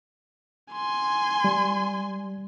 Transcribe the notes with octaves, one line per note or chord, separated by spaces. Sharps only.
G#5 C6
G3